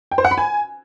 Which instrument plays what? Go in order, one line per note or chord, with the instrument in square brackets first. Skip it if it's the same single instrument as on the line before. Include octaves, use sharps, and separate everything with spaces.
[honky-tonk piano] G5
C5
F#5
B5
G#5